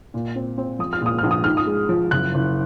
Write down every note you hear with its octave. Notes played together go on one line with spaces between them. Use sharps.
A#2
C4
C4
F3 D#6
F6
A#2 D#6
A#1 F6
D#6
G#2 F6
D#6
G#3
F3
F#1 F#6
F#1